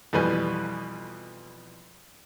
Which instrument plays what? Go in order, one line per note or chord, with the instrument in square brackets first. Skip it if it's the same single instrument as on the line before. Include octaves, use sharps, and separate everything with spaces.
[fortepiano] F2 B2 E3 G3 B4 G#5